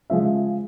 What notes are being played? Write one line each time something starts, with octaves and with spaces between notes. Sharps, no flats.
C#3 F3 G#3 E5